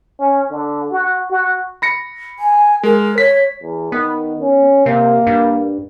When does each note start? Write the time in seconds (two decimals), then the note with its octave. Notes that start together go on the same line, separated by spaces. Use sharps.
0.20 C#4
0.50 D3
0.91 F#4
1.30 F#4
1.82 B5 A#6 C#7
2.39 G#5
2.83 G#3 A#4
3.18 C#5 B6
3.63 E2
3.92 D#3 B3
4.41 C#4
4.86 C3 A#3
5.27 G2